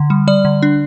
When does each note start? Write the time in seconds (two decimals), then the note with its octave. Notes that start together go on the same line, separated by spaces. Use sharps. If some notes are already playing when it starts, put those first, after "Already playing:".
Already playing: D3
0.10 G3
0.27 G3 D5
0.45 D3
0.62 D4